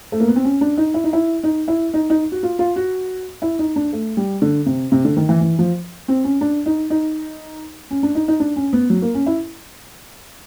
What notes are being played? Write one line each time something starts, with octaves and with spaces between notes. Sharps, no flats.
A3
A#3
B3
C4
C#4
D4
D#4
E4
D#4
E4
D#4
E4
D#4
D#4
F#4
F4
F4
F#4
E4
D#4
D4
A3
G3
D3
C3
C3
D3
D#3
E3
E3
F3
C4
C#4
D4
D#4
D#4
C#4
D4
D#4
D#4
D4
C#4
B3
F#3
A#3
C#4
E4